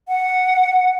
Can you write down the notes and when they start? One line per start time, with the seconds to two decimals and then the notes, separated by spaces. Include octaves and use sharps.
0.09 F#5